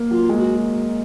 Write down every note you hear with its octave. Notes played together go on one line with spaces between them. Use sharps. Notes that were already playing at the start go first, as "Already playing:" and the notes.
Already playing: A#3
F#3 F4
G#3
F#4